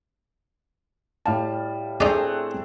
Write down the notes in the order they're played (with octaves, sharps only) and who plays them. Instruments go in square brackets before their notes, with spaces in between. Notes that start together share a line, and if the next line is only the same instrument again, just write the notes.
[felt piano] A2 F5 A5 [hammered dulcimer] G3
[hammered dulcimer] A3 C4 D4 [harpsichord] D#4 D5 [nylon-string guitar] G#4